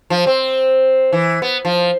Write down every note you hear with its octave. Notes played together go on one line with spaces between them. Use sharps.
F3
C4
E3
B3
F3